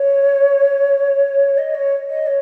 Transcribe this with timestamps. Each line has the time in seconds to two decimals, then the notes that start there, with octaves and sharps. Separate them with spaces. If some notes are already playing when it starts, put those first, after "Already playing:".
Already playing: C#5
1.58 D#5
1.74 C#5
2.09 D#5
2.26 C#5